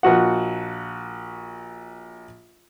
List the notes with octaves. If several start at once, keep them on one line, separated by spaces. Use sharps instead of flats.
A#1 F#4 F#5